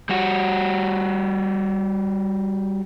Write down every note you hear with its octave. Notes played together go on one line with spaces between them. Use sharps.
G3 F#4